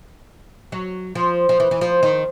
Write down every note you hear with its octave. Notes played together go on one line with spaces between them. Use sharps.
F#3
F3
F3
E3
E3
F3
D#3